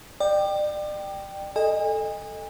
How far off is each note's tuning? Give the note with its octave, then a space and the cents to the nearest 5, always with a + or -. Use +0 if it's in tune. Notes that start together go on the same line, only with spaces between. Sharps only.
D5 +35 G5 +0
A4 +0 D#5 +0 G#5 -35